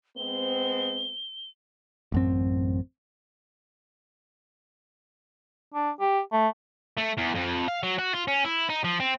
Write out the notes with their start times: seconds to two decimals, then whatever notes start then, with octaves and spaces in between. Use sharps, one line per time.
0.17 G#3 B3 C4 G7
2.12 A1 F#2 C4
5.74 D4
6.00 G4
6.33 A3
6.98 A3
7.18 E2
7.35 F2
7.68 F5
7.83 F#3
7.98 F#4
8.14 F4
8.28 C#4
8.45 E4
8.70 D#4
8.84 F3
9.00 C4